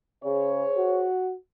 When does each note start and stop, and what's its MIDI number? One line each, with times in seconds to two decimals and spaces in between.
0.24 0.64 49
0.24 1.05 68
0.24 1.05 72
0.24 1.05 73
0.77 1.36 66